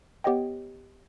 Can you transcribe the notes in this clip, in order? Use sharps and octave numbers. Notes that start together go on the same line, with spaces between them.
B3 G4 C#5 D#5 G5